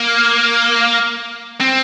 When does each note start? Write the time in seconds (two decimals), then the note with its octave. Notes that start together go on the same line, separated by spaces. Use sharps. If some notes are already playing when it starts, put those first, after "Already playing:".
Already playing: A#3
1.61 C4